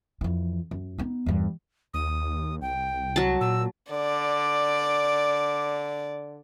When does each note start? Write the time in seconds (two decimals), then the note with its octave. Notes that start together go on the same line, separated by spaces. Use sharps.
0.21 F2 E3
0.71 F#2
0.98 B3 D#4
1.26 E2 G2
1.94 D#2 D#6
2.61 C2 G5
3.16 F#3 A5
3.41 A#2 E6
3.91 D3 D5 D6